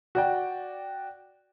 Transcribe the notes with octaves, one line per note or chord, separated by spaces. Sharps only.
F#4 D5 G5